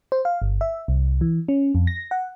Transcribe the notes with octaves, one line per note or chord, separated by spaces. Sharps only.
C5
F5
G1
E5
C2
E3
C#4
F2
A#6
F#5